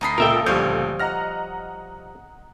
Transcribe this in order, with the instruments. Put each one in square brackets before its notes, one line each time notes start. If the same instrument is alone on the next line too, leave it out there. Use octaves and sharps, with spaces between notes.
[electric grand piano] D2 A5 C7 [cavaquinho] D#4 D#5 B5
[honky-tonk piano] C#2 A#2 A4 [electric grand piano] F4 [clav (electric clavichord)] A#4 E5 G5
[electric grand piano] D2 D#6 G6 [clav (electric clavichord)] F3 G3 [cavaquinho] C#5
[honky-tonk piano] D#5 F#5 A#5 [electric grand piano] F6 A#6